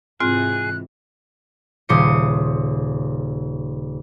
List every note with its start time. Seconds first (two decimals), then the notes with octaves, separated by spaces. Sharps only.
0.20 G#2 C3 E3 C4 F4 G#4 F#6
1.89 D#1 C#3 C5 D6 D#6 C#7